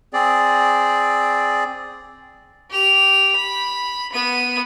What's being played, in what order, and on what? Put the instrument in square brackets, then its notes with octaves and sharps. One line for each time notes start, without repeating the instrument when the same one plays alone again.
[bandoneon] C4 G#4 D5
[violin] G4 F7
B5
B3 D#7